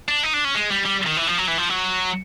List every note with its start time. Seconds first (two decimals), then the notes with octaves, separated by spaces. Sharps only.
0.08 D4
0.23 D#4
0.33 D4
0.45 C#4
0.55 G#3
0.71 G3
0.85 G3
1.06 D#3
1.17 E3
1.27 F3
1.38 F#3
1.48 E3
1.58 F3
1.69 F#3